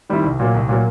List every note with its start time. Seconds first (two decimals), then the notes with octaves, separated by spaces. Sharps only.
0.10 D#3 G3 C4 E4
0.24 C2
0.40 A#2 F#3 A#3
0.54 C2
0.69 A#2 F#3 A#3